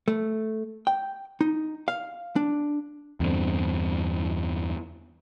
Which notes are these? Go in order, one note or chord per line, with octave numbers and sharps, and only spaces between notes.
A3
G5
D#4
F5
D4
E2 G2 D3 C4